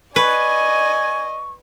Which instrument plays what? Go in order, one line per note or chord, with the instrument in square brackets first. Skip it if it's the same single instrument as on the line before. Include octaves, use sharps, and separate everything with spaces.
[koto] B4 [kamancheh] D5 D#5 [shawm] G#5 [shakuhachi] C#6